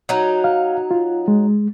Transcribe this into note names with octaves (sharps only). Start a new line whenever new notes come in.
F#3 D#4
F5
F4
G#3